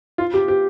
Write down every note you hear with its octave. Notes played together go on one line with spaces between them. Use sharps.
F4
G4
G4